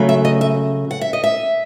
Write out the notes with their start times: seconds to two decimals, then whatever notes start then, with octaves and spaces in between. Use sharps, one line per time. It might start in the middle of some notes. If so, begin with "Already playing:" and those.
Already playing: C#3 F#3 A3
0.09 E5
0.25 D#5
0.41 E5
0.91 F#5
1.01 E5
1.13 D#5
1.24 E5